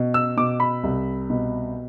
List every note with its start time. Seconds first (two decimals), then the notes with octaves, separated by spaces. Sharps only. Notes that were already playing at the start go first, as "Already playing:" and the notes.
Already playing: B2
0.14 E6
0.37 B2 D6
0.60 B5
0.84 C2
1.30 B2